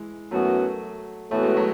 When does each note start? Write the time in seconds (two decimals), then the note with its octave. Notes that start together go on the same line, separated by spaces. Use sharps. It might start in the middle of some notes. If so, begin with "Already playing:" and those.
Already playing: E3 G#3
0.31 F#2 E3 F#3 A3 B3 F#4
1.30 A2 E3 A3 B3 F#4
1.43 G#3
1.57 F#3 A3